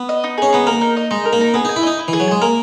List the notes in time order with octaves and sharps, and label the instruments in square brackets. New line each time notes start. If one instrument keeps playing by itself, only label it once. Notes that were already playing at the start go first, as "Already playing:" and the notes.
Already playing: [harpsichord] B3
[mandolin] D#5
D#4
[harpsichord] C#4 [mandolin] G#4
[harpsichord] B3 [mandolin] D#4
[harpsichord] A#3 [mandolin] A#4
[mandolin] D#4
D#5
[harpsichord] G#3 [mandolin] D#4
[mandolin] A#4
[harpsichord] A#3
[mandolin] D#4
[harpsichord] B3 [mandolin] G#4
[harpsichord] D#4 [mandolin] G#5
[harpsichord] E4
[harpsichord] D#4 [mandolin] D#5
[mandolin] E4
[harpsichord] E3 [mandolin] G#4
[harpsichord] F#3
[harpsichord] G#3 [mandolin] G#5
[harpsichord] A#3 [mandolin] A#4